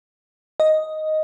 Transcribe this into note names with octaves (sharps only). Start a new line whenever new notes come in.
D#5